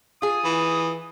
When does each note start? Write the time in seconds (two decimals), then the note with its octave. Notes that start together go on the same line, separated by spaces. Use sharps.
0.22 F4 G#4 D#6
0.44 E3